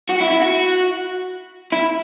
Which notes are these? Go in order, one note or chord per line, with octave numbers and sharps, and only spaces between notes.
F#4
E4
E4
F#4
E4